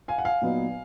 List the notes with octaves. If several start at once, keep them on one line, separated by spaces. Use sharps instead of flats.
F5 G#5
F#5
F5 G#5
A#2 F#3 B3 D#4